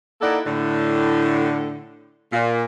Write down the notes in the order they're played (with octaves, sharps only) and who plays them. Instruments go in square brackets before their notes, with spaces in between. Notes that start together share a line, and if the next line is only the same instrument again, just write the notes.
[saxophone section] A#3 D#4 E4 A4 D5 F#5
A2 D3
A#2